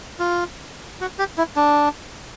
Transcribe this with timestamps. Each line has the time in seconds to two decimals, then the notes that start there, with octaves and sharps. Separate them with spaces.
0.20 F4
1.01 F#4
1.19 G4
1.38 E4
1.56 D4